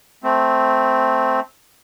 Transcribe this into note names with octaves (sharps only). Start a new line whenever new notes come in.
A3 C4